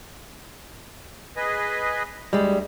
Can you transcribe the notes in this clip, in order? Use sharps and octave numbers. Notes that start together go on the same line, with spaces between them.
G#4 B4 D#5
D2 G3 G#3